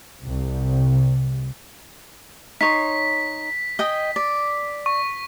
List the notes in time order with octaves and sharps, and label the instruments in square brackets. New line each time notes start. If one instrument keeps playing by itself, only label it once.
[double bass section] C2
[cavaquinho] D#4 C#5 C6 [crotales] B6
[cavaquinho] D#5 G5 G#5
D5
[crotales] C#6